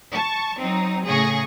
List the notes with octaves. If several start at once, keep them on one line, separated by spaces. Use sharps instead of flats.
A5 C#6
F#3 C4 D#4
A2 C#3 G#4 G#5 C#6 A#6